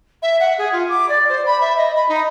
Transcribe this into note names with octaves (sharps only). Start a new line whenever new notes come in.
E5
F#5
G#4
F4
D6
D5
C5
B5
E5
D#5
B5
D#4